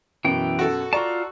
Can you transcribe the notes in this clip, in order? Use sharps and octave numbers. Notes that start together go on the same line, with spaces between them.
F#2 B2 E3 G5
F#4 A4
F4 D5 A5 A#5 C#6